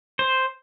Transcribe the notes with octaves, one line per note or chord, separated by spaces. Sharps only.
C5